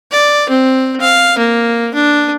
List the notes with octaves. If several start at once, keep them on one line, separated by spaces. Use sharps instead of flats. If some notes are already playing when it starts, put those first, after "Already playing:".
D5
C4
F5
A#3
D4